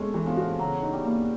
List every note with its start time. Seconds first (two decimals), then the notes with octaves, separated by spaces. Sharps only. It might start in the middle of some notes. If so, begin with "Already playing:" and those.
Already playing: G#3 A3 C#4
0.14 E3
0.26 F3
0.37 F#4
0.59 C#3 F#3
0.83 D#4
0.93 G3
1.05 A#3